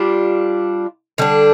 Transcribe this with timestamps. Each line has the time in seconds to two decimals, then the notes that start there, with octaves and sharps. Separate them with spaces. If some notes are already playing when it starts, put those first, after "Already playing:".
Already playing: G3 D4 F4
1.18 D3 G3 D4